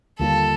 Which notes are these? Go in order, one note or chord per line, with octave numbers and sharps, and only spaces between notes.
D#2 D3 G3 A#3 F4 A4